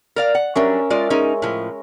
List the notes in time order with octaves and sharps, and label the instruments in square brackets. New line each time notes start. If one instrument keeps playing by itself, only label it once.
[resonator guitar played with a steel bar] A#4 D5 F5
F#5
[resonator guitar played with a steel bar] F#3 G3 D4 [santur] C#4 A#4 E5
[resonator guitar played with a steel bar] G#3 F4 D5
[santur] G#3 [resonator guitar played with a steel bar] C#4 D#4 A#4
[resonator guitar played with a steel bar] A2 F3